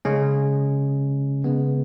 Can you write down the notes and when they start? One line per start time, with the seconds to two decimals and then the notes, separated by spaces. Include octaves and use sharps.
0.05 C#3 G#3 C#4
1.44 C#3 G#3 B3